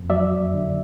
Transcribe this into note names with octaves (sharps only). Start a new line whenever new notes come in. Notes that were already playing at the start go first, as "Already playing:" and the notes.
Already playing: F2
F#3 D5 E5
F#2
D3